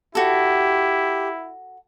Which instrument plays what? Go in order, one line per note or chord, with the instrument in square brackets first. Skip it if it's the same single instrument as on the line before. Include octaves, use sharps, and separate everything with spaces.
[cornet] E4 [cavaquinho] F#4 A4 [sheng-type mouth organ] G4